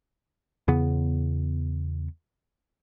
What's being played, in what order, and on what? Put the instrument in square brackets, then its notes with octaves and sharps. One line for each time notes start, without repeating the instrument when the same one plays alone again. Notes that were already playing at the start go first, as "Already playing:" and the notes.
[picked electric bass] E2 C#3 B3